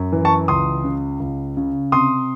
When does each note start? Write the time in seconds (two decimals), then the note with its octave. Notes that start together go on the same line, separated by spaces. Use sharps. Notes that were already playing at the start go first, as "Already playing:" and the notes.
Already playing: F#2
0.12 E3
0.25 A5 C#6
0.48 C#2 C6 D#6
0.84 C#3
1.20 C#2
1.57 C#3
1.92 C3 C6 D#6